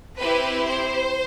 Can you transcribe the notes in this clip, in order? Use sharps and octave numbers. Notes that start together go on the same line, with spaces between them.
C4 E4 G4 B4
C5